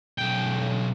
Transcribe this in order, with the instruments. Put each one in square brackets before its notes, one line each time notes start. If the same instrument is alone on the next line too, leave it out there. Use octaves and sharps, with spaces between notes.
[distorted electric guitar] B1 G5